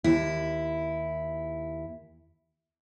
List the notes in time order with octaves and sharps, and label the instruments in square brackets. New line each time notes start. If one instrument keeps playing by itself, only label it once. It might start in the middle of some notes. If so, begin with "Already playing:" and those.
[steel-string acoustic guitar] D#2 E4